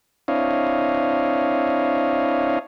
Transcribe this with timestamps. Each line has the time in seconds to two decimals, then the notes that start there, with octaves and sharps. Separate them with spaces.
0.28 C4 D4 E4 C#5 D#5 F5